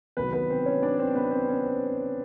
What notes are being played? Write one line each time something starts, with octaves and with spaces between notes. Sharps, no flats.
E2 C3 D#3 F#3 B3 B4
B3 B4
C4 C5
C#4 C#5
D4 D5
C4 C5
B3 B4
C4 C5
C#4 C#5